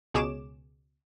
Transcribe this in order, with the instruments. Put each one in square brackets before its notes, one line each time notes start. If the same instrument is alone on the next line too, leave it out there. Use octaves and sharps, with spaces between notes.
[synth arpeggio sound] C#2 B2 G#4 C#5 D6 E7